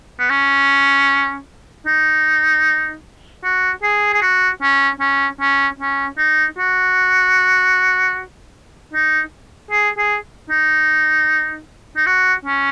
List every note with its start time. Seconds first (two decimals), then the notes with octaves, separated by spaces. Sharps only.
0.19 B3
0.30 C#4
1.86 D#4
3.44 F#4
3.83 G#4
4.14 G#4
4.22 F#4
4.62 C#4
5.00 C#4
5.40 C#4
5.79 C#4
6.18 D#4
6.58 F#4
8.93 D#4
9.71 G#4
9.98 G#4
10.50 D#4
11.97 D#4
12.06 F#4
12.45 C#4